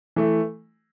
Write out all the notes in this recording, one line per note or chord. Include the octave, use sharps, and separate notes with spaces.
E3 A3